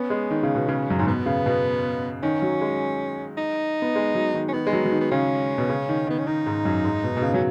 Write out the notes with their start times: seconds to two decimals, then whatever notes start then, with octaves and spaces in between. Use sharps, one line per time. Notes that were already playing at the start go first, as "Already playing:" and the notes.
Already playing: B3 C#4
0.10 G#3
0.30 D#3
0.43 C#3
0.55 B2
0.68 C#3
0.90 F#2
0.98 G#2 C#4
1.07 B2 B3
1.26 C#3
1.46 B2
2.23 D#3 C#4
2.42 F#3
2.61 G#3
3.37 D#4
3.82 B3
3.96 G#3
4.15 F#3
4.34 D#3
4.49 C#4
4.53 D#3 B3
4.67 G#3
4.73 F#3
4.86 F#3
4.92 D#3
5.00 B3
5.11 C#3 C#4
5.58 B2
5.70 C#3
5.89 D#3
6.07 D#3 B3
6.19 C#4
6.27 D#3 D#4
6.46 G#2
6.65 F#2
6.84 G#2
7.04 B2
7.17 B2
7.22 C#3
7.33 F#3 C#4